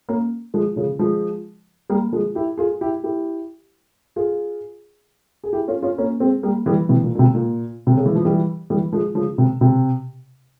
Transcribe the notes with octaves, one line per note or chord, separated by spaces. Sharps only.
A#3 C#4
F3 G#3
C#3 F3
F3 G#3
G3 A#3
F3 G#3
E4 G4
F4 G#4
E4 G4
E4 G4
F4 G#4
G#4
E4 G4
C#4 F4
C#4 F4
A#3 C#4
G#3 C4
G3 A#3
E3 G3
C3 E3
A#2
A#2
C3
A#2
C3
C#3
E3
F3
E3 G3
E3 G3
F3 G#3
C#3 F3
C3
C3